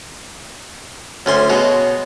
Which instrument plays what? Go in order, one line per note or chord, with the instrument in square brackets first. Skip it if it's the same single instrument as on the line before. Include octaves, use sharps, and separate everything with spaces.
[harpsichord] D2 A3 C6 [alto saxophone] C#4
[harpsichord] B2 G#3 [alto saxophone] C#5